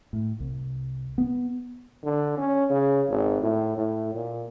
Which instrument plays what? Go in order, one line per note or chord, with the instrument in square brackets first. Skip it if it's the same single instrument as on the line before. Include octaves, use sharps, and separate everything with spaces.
[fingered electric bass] A2
C2
B3
[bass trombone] D3
C#4
C#3
G#1
A2
A2
A#2